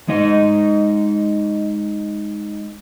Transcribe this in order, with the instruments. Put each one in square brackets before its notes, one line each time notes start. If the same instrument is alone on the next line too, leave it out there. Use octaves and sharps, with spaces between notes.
[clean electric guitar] G#3 D#4 D#5